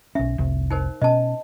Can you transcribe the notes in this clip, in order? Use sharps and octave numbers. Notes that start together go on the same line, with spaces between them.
B1 C#4 E5
F1 C2
D#4 A#4 C5
B2 B3 C#4 D#5 A5